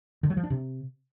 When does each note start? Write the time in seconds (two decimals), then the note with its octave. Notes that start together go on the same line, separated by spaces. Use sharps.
0.23 D3
0.30 F#3
0.37 F3
0.44 D4
0.50 C3